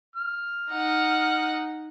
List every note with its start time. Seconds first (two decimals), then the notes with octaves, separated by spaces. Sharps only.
0.16 F6
0.71 D#4 F#5